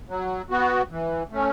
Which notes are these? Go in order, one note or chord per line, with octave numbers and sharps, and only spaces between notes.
F#3
B3 F#4
E3
A3 C#4